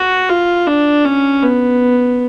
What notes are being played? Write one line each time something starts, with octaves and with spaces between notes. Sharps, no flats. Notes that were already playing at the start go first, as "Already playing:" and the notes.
Already playing: F#4
F4
D4
C#4
B3